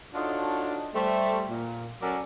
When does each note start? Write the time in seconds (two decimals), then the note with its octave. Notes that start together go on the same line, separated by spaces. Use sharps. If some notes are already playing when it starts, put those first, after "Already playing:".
0.15 D4 D#4 F4 F#4 A4 C#5
0.94 G3 A3 C5
1.50 A#2
2.02 F#3 C#4 A4 A#4 D5